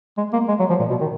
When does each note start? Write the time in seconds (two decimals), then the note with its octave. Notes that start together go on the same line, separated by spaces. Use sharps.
0.17 G#3
0.33 A#3
0.48 G#3
0.59 F#3
0.69 F3
0.80 A#2
0.90 B2
1.00 D#3